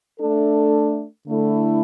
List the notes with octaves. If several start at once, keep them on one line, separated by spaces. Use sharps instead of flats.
A3 D4 A4
D3 A3 E4